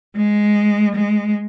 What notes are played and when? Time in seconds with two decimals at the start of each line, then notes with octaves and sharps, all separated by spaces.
0.16 G#3
0.95 G#3